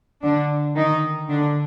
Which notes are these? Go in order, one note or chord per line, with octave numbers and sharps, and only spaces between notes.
D3 D4
D#3 D#4
D3 D4